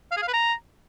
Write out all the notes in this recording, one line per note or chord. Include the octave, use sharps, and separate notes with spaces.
F5
G#4
F5
B4
A#5